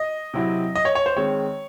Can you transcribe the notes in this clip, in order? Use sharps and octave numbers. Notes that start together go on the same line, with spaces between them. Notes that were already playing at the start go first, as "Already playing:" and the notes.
Already playing: D#5
C3 F#3 C4 E4
D#5
C#5
C#5
C5
D#3 G#3 C4 C#5